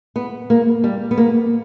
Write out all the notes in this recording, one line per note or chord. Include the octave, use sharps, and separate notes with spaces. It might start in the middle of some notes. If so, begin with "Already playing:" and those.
B3
A#3
G3
B3
A#3